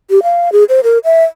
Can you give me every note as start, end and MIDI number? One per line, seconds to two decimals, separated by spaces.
0.10 0.23 67
0.23 0.52 77
0.52 0.64 68
0.69 0.81 72
0.84 0.98 70
1.04 1.24 76